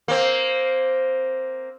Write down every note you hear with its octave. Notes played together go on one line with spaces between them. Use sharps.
A#3 C4